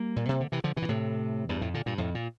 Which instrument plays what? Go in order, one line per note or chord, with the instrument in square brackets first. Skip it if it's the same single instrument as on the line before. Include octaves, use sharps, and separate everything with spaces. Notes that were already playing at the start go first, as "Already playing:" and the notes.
Already playing: [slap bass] G3 A#3
A#2
C3
D3
C3 E3
D3 F3
C3 E3
A#2
A2 C3
E2 G2
F2 A2
A#2 D3
G2 A#2
F2 A2
A#2